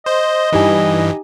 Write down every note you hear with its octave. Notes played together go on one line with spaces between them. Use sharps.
C5 D#5
G2 E3 D#4 G4 G#5